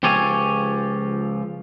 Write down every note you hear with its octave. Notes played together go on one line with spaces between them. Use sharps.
C#2 F3 G4 A4 C#5 G#5